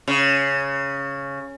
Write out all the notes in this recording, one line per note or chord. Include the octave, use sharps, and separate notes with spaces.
C#3